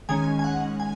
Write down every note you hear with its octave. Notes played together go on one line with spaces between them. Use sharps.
D#3 G#3 C#4 G#5
G#5
F#5
G#5